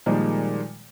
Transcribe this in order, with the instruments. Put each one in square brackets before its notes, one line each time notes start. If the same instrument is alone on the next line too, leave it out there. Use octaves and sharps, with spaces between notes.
[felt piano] A#2 D#3 F3 G3 G#3